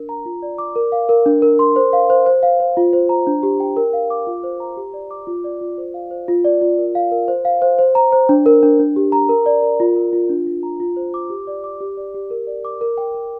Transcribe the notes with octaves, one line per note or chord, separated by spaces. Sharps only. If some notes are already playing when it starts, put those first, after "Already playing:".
Already playing: D4 A#4
A#5
F4
D5
D6
A#4
F5
A#4
D4
A#4
C6
C5
F5
C5
C5
F5
C5
F4
C5
A#5
D4
G4
G5
A#4
F5
D6
F4
C5
A#5
G4
D5
D6
F4
D5
F4
C5
F5
C5
F4
D5
F4
A#4
F5
A#4
C5
F5
C5
C5
A#5
C5
D4
A#4
D4
D4
G4
A#5
A#4
D5
A#4
F4
A#4
F4
D4
F4
A#5
F4
C5
D6
G4
D5
D6
G4
D5
G4
A#4
D5
D6
A#4
G5
A#4